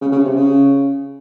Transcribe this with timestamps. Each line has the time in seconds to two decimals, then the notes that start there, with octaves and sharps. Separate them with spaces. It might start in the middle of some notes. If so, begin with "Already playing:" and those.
0.01 C#3
0.12 C#3
0.24 C3
0.36 C#3